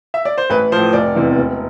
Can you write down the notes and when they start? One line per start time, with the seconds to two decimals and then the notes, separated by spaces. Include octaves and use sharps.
0.14 E5
0.25 D5
0.38 C5
0.50 A1 B4
0.72 A2 F3 C5
0.93 F1 D5
1.15 E2 C3 E3
1.38 E1